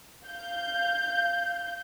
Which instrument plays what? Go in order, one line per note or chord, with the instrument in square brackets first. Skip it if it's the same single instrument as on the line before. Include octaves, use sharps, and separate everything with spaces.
[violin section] F5 G6